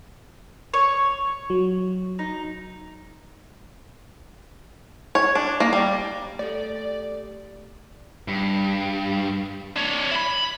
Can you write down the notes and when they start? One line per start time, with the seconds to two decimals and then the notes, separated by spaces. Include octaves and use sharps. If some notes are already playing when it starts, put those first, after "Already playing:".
0.74 C#5
1.50 F#3
2.19 D#4
5.15 C#5
5.35 D4
5.60 A#3
5.73 G3
6.39 A3 G4 A4 D5
8.28 G2
9.76 D4 C#5
10.11 E4 B5